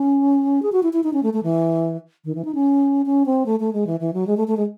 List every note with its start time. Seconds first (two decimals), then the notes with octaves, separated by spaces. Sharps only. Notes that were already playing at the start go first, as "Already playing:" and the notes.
Already playing: C#4
0.63 G#4
0.72 F#4
0.83 E4
0.93 E4
1.04 D#4
1.13 C#4
1.23 A3
1.33 A3
1.43 E3
2.25 D#3
2.35 E3
2.45 D#4
2.55 C#4
3.06 C#4
3.26 C4
3.46 A3
3.60 A3
3.73 G#3
3.87 E3
4.00 E3
4.14 F#3
4.27 G#3
4.37 A3
4.48 A3
4.57 G#3